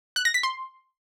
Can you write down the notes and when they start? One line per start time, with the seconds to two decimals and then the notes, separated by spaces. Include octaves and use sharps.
0.16 F#6
0.25 A#6
0.34 B6
0.43 C6